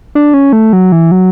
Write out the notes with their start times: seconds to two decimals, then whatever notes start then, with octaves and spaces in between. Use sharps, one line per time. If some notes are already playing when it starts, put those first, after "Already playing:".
0.15 D4
0.34 C#4
0.53 A3
0.73 F#3
0.92 E3
1.11 F#3